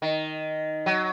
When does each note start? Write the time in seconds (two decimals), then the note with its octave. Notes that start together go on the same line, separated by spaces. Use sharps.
0.02 D#3
0.86 F#3